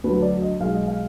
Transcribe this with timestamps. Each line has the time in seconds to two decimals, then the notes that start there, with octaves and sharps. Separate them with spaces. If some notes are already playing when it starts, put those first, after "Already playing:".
0.04 D2 D3 F#3 B4
0.22 D5
0.42 D#5
0.60 B1 B2 G#3 F5
0.74 D#5
0.87 F5